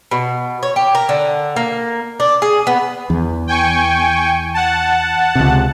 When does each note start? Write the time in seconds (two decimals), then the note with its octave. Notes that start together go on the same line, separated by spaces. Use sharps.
0.11 B2
0.63 C#5
0.76 G4
0.95 A#4
1.09 D3
1.56 A#3
2.20 D4
2.42 G#4
2.67 B3
3.10 E2
3.47 G5 G#5 C#6
4.54 F#5 A5
5.35 C#2 C3